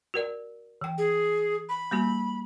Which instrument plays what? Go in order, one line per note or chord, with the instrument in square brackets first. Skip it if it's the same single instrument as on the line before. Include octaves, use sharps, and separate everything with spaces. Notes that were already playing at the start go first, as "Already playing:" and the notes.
[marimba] F#4 A#4 D5
E3 G5
[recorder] G#4
B5
[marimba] G3 A#3 F#4